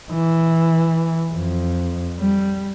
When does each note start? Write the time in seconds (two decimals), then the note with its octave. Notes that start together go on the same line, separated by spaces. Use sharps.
0.13 E3
1.32 F2
2.20 G3